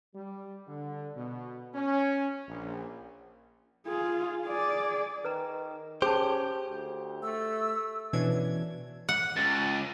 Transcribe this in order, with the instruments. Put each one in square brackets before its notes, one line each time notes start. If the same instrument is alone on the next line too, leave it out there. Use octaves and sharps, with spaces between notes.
[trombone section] G3
D3
B2
C#4
A#1
[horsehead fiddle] F4 G#4
G#4 D5
[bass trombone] D#3 [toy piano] B4 A#5
[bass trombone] C#4 [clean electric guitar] G4 C5 [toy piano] G#4 A5
[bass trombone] D2
[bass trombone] A3 [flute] E6
[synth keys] B2 E3 C#4 D4 G#6
[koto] F#5
[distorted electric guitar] C#2 [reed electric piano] A6